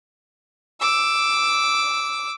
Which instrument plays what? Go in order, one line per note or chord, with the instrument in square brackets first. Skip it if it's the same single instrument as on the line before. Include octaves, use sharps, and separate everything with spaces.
[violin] D6 E6